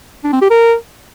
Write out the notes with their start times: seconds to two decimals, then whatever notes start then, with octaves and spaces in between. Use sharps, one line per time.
0.24 D4
0.33 C4
0.42 G4
0.50 A#4